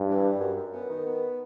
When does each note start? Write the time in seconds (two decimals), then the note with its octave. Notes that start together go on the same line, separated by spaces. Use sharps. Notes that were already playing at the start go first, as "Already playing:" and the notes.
Already playing: G2
0.08 E3
0.24 G3
0.40 F#2
0.56 F#2
0.73 B3
0.90 D#3
1.05 B3